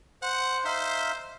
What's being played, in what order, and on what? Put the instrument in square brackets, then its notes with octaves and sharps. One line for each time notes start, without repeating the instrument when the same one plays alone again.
[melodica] C5 [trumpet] F#5
[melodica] D#4 E5 F5 [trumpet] C5